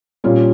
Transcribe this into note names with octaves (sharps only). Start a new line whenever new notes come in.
A#2 G3 C#4 F4